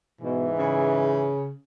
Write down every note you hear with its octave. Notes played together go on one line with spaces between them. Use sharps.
G#2 B2 E3
C#3